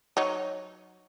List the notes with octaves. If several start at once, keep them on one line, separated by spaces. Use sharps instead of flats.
F#3 D#4 C#5